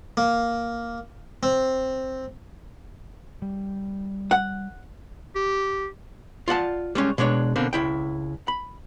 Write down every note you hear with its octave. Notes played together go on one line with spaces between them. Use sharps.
A#3
C4
G3
F#5
G4
F4 D5 F#5 A5
G3 G#3 C#4
B2 G#3 D4 C#5
B2 D3 A#3 C4
C#2 E4 G5
B5